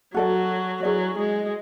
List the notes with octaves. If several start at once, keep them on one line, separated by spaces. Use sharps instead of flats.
F#3 F#4 A4 D5
F#3 E4 G#4 B4 D5
G#3